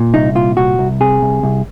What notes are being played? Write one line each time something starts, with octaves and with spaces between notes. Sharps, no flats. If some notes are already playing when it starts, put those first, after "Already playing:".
Already playing: A#2
C2 D#4
A#2 F4
C2 F#4
C2
C3 G#4
C2
C2